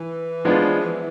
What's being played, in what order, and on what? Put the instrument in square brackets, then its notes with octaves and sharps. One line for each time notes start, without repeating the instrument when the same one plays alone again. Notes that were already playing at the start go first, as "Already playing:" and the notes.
Already playing: [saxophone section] E3
[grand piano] F3 G#3 B3 D4 F4